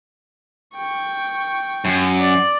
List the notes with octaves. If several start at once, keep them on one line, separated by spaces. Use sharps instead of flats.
G5 C#6
F#2
D5